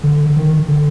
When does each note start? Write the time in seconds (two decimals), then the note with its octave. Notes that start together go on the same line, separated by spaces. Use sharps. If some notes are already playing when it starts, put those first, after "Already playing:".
0.03 D3
0.36 D#3
0.68 D3